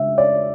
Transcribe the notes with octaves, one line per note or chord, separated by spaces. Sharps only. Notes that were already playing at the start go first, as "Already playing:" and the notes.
Already playing: C#3 G#3 D4 E5
D5